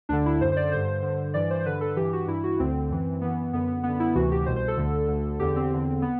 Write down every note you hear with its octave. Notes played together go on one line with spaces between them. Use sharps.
D2 D3 D4
E4
F#2 D3 C5
C5
D5
G2 D3 C5
C5
G2 D3
G2 E3 D5
C5
C5
G2 D3 B4
A4
G2 E3 G4
F#4
G2 E3 E4
F#4
D2 D3 C4
F#2 E3
F#2 E3 B3
F#2 D3 B3
B3
F#2 D3 B3
E4
D2 C3 E3 F#4
G4
C2 B2 C5
C5
A4
D2 D3
D2 D3
E2 D3 G4
C4
E2 D3
B3